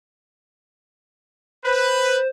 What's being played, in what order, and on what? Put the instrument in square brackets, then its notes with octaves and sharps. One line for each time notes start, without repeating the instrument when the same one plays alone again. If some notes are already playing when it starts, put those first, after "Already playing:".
[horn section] B4 [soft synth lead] C5